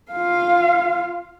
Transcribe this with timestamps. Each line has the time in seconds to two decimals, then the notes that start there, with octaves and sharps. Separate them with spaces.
0.12 F4 F5